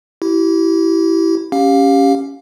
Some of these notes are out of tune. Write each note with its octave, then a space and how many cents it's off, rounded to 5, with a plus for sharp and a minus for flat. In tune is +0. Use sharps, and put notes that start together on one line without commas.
E4 +0 G4 -30
C#4 +0 G4 +5 F5 +20